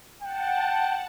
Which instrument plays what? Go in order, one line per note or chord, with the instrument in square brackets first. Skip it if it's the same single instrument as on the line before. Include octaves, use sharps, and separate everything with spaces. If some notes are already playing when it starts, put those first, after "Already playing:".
[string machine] F#5 A5 [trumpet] G5